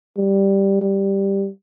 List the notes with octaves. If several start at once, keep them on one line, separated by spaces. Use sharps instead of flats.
G3
G3